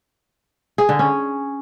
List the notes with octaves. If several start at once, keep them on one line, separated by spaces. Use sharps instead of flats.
G#4
D3
C#4